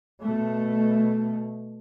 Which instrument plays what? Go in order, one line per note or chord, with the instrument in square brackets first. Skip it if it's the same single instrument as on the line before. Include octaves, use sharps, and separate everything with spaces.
[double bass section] B2 A3